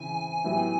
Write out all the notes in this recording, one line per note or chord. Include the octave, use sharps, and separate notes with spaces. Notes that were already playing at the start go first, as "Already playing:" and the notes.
Already playing: C#3 E3 C4 G#5
A2 F#3 B3 E4 G4